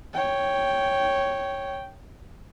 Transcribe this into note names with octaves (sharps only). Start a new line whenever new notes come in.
C#5 G5